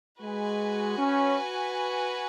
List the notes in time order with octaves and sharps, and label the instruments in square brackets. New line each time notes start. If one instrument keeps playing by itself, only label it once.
[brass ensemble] G#3 [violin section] F#4 B4 G#5
[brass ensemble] C#4